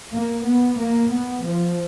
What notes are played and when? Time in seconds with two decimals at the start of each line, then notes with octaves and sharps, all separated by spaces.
0.13 A#3
0.45 B3
0.79 A#3
1.12 B3
1.44 F3